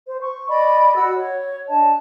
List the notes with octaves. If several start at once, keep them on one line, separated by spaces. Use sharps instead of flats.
C5
C#6
D5 D#5 B5
F#4 E6
C#5
D4 D#5 A5